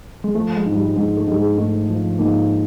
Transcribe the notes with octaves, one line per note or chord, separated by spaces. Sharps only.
G#3
F3 A3
G#3
G#2
G3
G#2 G#3
A3
G#2 G3
G#3
G#2 A3
F3
G#2 A#3